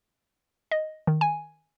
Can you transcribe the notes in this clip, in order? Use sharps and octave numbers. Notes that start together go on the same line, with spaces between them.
D#5
D#3
G#5